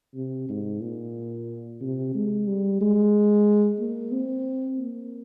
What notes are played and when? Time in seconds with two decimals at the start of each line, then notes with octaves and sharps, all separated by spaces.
0.15 C3
0.49 G#2
0.82 A#2
1.82 C3
2.15 G#3
2.47 G3
2.81 G#3
3.80 A#3
4.12 C4
4.79 A#3